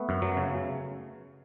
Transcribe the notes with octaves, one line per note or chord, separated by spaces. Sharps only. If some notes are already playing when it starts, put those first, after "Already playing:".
Already playing: A3 B3
F#2
F#3
C#3